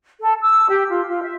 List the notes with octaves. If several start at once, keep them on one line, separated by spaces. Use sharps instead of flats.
A4
E6
G4
F4
F4
E5